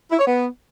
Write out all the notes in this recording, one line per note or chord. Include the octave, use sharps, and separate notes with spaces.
E4
C#5
B3